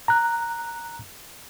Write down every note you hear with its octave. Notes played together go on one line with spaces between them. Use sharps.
A#5 F#6